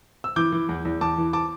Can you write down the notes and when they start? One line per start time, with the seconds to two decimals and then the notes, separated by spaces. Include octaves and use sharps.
0.24 E6
0.36 E3 D6 G6
0.52 E3
0.69 E2
0.85 E2
1.01 E2 A5 D6
1.18 E3
1.33 A5 D6